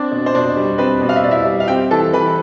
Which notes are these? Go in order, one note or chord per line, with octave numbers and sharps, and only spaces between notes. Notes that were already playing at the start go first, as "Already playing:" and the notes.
Already playing: C4 D4 D5
B2
C5
B2 D4 D5
G3
C4 B4
B2
F5
E5
B2 D5
E4 E5
G3
F5
C4 G4 G5
E3 A4 A5
E3 B4 B5